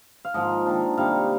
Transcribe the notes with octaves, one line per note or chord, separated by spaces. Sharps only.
F5
G#2 F3 A#3 D#5
D#3 A#3 D4
C3 G3 A#3 D#4 F5